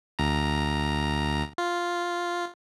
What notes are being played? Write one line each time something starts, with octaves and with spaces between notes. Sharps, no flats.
D2 A#5
F4